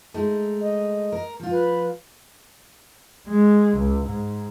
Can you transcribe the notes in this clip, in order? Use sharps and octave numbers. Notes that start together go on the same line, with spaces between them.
G#3 A3 D#4
D#5
A#4
F3 F4
B4
G#3
C#2
G#2